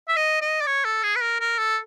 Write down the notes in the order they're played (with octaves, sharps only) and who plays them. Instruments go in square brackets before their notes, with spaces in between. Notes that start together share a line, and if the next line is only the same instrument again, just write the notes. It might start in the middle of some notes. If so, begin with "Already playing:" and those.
[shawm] E5
D#5
D#5
D5
C#5
A4
G#4
B4
A#4
A#4
A4